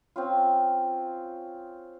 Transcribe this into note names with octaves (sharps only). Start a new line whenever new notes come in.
C4 C#4 F4